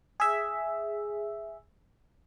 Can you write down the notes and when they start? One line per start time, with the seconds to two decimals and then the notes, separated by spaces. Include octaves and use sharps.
0.20 G#4 E5